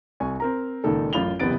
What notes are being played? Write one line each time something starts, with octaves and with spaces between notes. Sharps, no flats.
C2 G#5 C#6
C4 A#4 A#5
C#2 A#2 D#3 A4
A1 F#2 F4 B5 F7 G7
F#1 C3 E3 B3 A6 D7